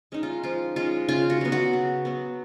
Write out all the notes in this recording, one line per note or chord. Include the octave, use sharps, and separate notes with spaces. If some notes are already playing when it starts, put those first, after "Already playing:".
G#3 C#4 D#4
F4
F3 F4
G#3 C#4 F4
C#3 F4
F#4
F#3 B3
F#4
C#3
F#3 B3